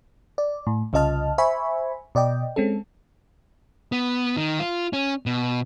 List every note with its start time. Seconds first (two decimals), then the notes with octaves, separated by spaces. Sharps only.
0.38 D5
0.67 A2
0.93 C2 C#3 F4 D#5 A5 F6
1.38 C5 E5 G#5 B5 C#6
2.15 B2 D5 D#5 G5
2.56 G#3 C4 C#4 A4
3.92 B3
4.36 D#3
4.59 F4
4.93 C#4
5.26 B2